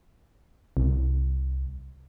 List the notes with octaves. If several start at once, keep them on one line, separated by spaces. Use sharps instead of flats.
C2